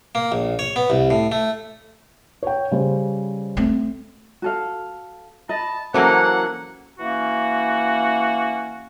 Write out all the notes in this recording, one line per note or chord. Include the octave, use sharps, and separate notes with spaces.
A#3
A#1
C#5
B3
C2
A2
A3
C#5 G5
C#3 G3 C5
A3 C4
F#4 A4 F5
D#5 A5 B5
E3 F#3 A#3 C#4 A4 C5 F#5
E3 A#3 C#4 F#4